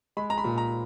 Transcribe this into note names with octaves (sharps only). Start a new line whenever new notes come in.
G#3 B5
A#5
B5
A#2
A#5